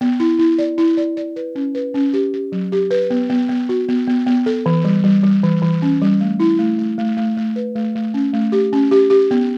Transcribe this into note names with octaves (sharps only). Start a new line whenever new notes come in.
B3
E4
E4
D5
E4
D5
D5
B4
C#4
B4
C#4
G4
G4
F#3
G4
B4
B3
B3
B3
F#4
B3
B3
B3
A4
E3
G3
G3
G3
E3
E3
C#4
G3
A3
E4
A3
A3
A3
A3
A3
B4
A3
A3
C#4
A3
G4
C#4
G4
G4
B3